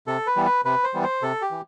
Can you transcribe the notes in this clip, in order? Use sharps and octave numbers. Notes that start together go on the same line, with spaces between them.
C3 A4
B4
E3 G3 B3
B4
C3 B4
C5
E3 G3 B3
C5
C3 A4
G4
E3